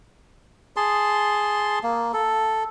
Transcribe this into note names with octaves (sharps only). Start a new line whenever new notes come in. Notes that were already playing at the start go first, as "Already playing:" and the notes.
G#4 A5 C6
A#3
A4